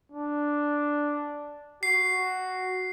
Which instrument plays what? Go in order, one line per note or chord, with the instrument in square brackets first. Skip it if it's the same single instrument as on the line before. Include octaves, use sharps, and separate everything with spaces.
[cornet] D4
[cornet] F#4 [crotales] C7